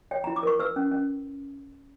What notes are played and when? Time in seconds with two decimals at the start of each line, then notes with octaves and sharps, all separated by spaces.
0.11 C#5 G5
0.24 E4 A#5
0.36 D6
0.43 A#4 C#6
0.59 B4 E6
0.76 C#4
0.91 C#4